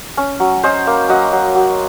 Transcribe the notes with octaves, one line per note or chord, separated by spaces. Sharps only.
C#4
F#3
C#4 C5 D#5
A#3
F#3 D#5 F#5
F#3
F#3